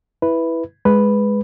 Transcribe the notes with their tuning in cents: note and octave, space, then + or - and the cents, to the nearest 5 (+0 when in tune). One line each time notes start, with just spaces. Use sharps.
E4 +0 B4 +0
G#3 +0 B4 +0